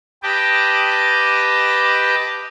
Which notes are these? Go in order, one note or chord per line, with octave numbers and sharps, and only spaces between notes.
G4 B4 D#5 G5 A5 D6